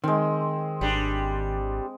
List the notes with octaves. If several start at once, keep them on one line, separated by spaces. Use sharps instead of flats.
D#3 G#3 C4
G#1 G3 D4